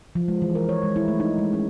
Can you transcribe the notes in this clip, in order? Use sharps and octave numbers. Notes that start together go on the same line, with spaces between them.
F3
G#3
E3
A#4
C#5
G#3
E4
A3
D#4
G#3
C#4